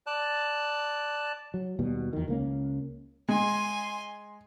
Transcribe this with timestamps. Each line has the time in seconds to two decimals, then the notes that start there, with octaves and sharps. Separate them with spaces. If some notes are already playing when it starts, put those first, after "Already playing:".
0.06 D5 A5 F#6
1.54 F#3
1.79 D#2 B2 G3
2.13 E2 D#3
2.28 C#2 A#3 C#4
3.29 G#3 G#5 C6